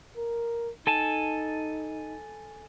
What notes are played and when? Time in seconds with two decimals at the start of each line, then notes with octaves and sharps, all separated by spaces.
0.17 A#4
0.87 D#4 A4 G#5 A5